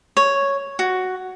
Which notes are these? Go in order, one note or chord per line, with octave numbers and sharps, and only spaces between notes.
C#5
F#4